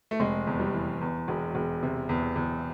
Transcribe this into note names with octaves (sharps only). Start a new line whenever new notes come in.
A3
F1 G#3
E2
G3
E3
E2
E1
E1
C3
E2
E2